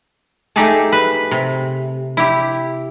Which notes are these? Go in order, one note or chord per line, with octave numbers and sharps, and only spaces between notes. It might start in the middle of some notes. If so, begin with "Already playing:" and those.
A3 D#4 G4 G#4 G#5 A5
B4
C3
E4 G4